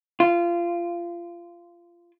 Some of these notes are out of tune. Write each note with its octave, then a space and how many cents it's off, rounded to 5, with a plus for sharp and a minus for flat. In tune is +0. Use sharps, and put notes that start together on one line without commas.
F4 -20